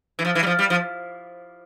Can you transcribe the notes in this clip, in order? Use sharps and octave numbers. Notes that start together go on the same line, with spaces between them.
E3
F3
E3
G3
F3
G3
F3